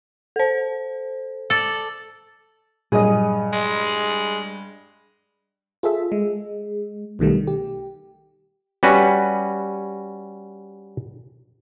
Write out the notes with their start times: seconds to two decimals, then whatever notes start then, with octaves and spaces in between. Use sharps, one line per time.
0.36 A4 C5
1.50 A4 D5
2.92 G2 A#2 F#3 G#4 D#5
3.53 G#3
5.83 F4 G#4 A4 E5
6.12 G#3
7.19 B1 B2 D#3 G3 A3
7.48 G4
8.83 G3 C#4 F#4 B4